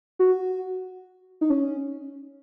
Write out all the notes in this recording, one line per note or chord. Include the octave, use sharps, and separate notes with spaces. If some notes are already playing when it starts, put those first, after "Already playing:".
F#4
D#4
C#4